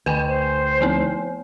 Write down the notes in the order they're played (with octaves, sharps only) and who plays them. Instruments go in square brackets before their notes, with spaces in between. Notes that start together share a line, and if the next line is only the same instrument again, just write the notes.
[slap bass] D2 [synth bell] B4 G5 G#5
[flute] C5
[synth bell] F3 B3 C4